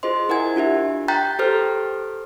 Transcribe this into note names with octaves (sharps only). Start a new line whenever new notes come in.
F4 G#4 C5 D#5 C6
E4 A#4 F#5 G#5 G#6
D4 F4 G4 E5
G5 A#5 F#6 G6 A6 B6
G4 A4 C5 F6